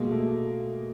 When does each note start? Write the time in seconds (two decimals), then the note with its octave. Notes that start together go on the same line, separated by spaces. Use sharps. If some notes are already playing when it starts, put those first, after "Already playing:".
Already playing: B2 G#3 A#3
0.11 A3